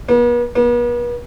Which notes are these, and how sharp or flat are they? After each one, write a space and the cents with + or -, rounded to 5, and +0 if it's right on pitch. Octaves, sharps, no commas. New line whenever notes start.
B3 -40
B3 -40